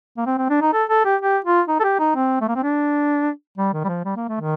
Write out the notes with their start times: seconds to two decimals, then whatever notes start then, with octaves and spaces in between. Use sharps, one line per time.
0.18 A#3
0.26 C4
0.38 C4
0.50 D4
0.61 D#4
0.73 A4
0.89 A4
1.05 G4
1.21 G4
1.45 F4
1.68 D#4
1.80 A4
1.84 G4
2.00 D#4
2.15 C4
2.41 A3
2.48 A#3
2.56 C4
2.63 D4
3.58 G3
3.74 D#3
3.84 G3
3.89 F3
4.05 G3
4.17 A#3
4.28 A3
4.41 D#3